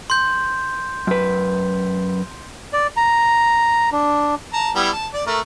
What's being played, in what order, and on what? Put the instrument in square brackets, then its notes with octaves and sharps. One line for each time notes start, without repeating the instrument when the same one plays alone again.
[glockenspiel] C6 G6
[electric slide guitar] F#2 B4
[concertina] D5
A#5
D4
[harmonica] A5 A#5
G3 B3 E4
A5
D5
A3 A#4